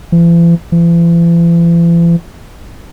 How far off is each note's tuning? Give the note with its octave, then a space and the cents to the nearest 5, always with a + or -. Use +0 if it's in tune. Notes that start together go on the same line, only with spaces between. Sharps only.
E3 +45
E3 +45